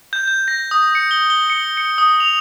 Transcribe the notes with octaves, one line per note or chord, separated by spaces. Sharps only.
G6
G6
A#6
D#6
C#7
G7
G7
C#7
C#7
D#6
F7